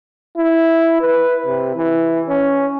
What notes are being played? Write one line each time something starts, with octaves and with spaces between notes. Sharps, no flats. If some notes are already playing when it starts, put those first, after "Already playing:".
E4
B4
C3
E3
C#4